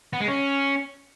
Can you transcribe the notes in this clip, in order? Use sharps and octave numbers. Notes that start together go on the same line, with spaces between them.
B3
G#3
C#4